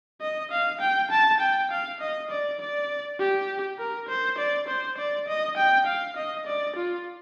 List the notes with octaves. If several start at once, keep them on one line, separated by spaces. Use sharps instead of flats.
D#5
F5
G5
A5
G5
F5
D#5
D5
D5
G4
A#4
C5
D5
C5
D5
D#5
G5
F5
D#5
D5
F4